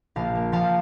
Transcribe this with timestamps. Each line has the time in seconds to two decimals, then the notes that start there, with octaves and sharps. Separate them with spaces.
0.16 A#1 F5 A5
0.35 A#3
0.52 F3 F5 A5